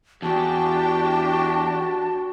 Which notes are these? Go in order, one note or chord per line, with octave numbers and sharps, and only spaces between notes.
E2 D4 F#4 G4 G5 A5